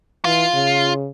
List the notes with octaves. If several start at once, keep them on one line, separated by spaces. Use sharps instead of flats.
E3 F4
C#3